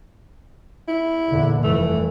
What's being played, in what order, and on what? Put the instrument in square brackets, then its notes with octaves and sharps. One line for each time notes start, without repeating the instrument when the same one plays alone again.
[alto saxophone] E4
[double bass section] E2 A#2 D3
[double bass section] F1 G2 E3 [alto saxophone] A3